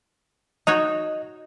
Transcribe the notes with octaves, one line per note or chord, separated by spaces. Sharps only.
D#4 F#4 C#5 D#5